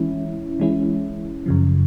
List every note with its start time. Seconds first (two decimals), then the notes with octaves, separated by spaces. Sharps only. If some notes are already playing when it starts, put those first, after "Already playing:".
Already playing: E3 G#3 C#4 E4
0.60 E3 G#3 C#4 E4
1.46 F#2 C#3 F3